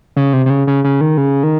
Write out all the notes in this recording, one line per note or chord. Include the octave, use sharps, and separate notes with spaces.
C#3
C3
C3
C#3
C#3
C#3
D#3
C#3
D#3